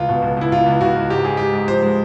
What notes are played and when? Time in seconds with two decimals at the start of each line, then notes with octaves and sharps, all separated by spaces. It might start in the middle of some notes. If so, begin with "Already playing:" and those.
Already playing: C#2 F4
0.09 B2
0.22 C#2
0.37 C#2 E4
0.52 C#2 F4
0.66 C#2
0.81 C#2 F#4
0.96 C#2
1.10 G#2 G4
1.24 G#2 G#4
1.37 G#2 G4
1.53 G#2
1.68 F3 C5
1.82 G#3